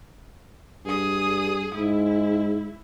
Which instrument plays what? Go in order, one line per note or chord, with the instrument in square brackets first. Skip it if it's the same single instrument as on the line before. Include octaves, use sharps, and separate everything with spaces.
[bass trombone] G2 [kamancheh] G#4 D#6
[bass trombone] G#2 [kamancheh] E4